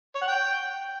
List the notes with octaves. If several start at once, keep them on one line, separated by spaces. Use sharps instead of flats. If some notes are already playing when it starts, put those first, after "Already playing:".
C#5
F#5
G5